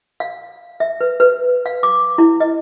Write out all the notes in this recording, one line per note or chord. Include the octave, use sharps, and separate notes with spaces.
F5
E5
B4
B4
F5
D6
E4
D#5